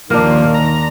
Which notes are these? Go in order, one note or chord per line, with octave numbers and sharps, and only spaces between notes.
D#2 A#2 D#3 F3 A#3 D4 C6
A#5